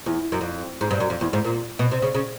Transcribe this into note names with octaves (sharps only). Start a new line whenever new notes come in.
E2
F#2
F2
G#2
G2
F#2
F2
E2
G#2
A#2
B2
C3
C#3
C#3